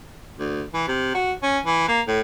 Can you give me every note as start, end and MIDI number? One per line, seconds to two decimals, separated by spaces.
0.39 0.63 38
0.74 0.84 52
0.88 1.10 48
1.15 1.33 66
1.43 1.59 61
1.65 1.87 52
1.89 2.01 58
2.07 2.21 45